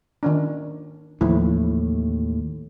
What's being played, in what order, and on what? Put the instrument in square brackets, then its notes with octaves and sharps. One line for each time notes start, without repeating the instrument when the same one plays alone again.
[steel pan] D#3 C#4 D4
[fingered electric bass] D#2 A2 [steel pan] E3 F3 E4